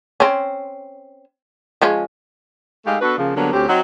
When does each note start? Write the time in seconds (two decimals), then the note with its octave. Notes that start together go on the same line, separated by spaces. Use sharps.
0.20 C4 C#4
1.82 F3 G#3 C#4
2.85 G#3 A3 D#4 G4 A4 F5
3.01 B3 D4 F#4 A4 B4
3.18 C#3 F3 A#3
3.36 D3 F#3 G3 A#3 B3
3.53 D2 C4 C#4 G4
3.69 F#3 C4 D#4